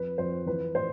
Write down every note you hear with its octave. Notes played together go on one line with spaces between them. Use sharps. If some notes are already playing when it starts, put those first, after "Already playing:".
Already playing: F2 B4
F2 C5
E3 B4
A2 C5